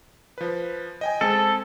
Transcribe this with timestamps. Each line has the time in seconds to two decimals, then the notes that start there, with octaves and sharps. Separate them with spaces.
0.38 F3 B4
1.01 D#5 G5 G#5
1.21 G#3 C4 G#4 A4